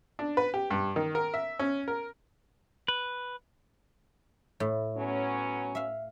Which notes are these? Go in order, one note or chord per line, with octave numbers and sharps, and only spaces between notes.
D4
B4
G4
G2
D#3
A#4
E5
C#4
A#4
B4
A2
F#3 B3 C#4
E5 F5